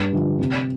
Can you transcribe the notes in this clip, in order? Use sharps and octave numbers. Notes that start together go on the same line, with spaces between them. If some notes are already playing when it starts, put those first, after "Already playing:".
Already playing: G2
D3 F3
C3